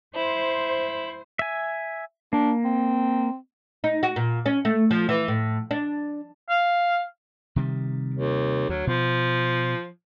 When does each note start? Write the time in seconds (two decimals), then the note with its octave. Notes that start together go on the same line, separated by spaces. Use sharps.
0.15 E4 C5
1.39 E5 G#5
2.33 A#3 D4
2.65 C4
3.84 D#4
4.03 F#4
4.16 A#2
4.46 C#4
4.65 A3
4.91 F3
5.09 E3
5.28 A2
5.71 D4
6.49 F5
7.56 C3 D#3 G3
8.14 D#2
8.69 D2 F#3
8.87 B2 F3